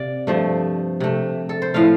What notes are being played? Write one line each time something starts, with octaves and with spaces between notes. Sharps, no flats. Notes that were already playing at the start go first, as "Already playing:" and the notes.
Already playing: C3 D5 F5
G2 F3 A3
C3 A3
A4
C5
A2 F3 A3 F5